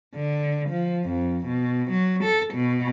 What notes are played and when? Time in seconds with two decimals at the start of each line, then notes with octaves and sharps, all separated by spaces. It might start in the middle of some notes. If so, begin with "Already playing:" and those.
0.15 D3
0.69 F3
1.04 F2
1.47 B2
1.91 F#3
2.24 A4
2.54 B2